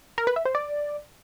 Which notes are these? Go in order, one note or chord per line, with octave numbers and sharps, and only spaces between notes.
A#4
B4
E5
C5
D5